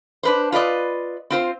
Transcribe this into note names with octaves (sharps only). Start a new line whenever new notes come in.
D4 B4 C5
F4 B4 D5 D#5
C4 F4 C5